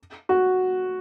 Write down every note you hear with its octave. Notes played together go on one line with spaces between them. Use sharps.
F#4